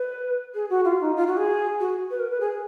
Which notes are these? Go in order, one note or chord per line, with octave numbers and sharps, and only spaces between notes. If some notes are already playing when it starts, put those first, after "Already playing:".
Already playing: B4
G#4
F#4
F4
D#4
F4
F#4
G#4
F#4
B4
A#4
B4
G#4